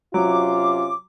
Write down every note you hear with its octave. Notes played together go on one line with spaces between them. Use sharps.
C3 F#3 C#4 F4 D6